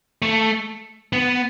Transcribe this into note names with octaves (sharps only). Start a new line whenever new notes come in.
A3
B3